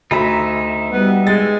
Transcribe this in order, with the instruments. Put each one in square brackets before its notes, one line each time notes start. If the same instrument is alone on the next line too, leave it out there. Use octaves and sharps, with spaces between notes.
[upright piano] D2 A#5 B5 [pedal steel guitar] D#4 E5
[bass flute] G3 [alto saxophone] B3
[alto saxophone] G#3 [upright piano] A6